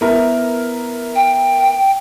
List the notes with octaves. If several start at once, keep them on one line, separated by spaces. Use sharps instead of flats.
B3 E4 A#4
G5